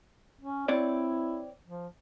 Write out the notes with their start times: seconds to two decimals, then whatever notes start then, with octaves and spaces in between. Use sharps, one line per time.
0.41 C#4
0.68 C4 E4 C#5 D5
1.67 F3